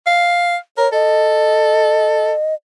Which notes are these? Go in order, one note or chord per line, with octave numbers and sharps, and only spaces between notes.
F5
A#4 C#5
A4 D#5